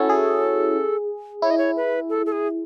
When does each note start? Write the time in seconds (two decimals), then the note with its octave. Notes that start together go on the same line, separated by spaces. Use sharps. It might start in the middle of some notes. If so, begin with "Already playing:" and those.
Already playing: C#4 E4 F#4 A4 C#5
0.09 G#4
1.42 E4 C#5
1.51 D#5
1.58 C#5
1.76 B4
2.10 A4
2.26 A4
2.32 G#4